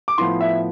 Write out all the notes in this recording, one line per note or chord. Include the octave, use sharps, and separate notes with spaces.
D6
A2 F3 B3 E4 C6
E5